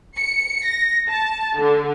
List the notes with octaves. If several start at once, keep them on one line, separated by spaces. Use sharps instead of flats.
C#7
A#6
A5
D3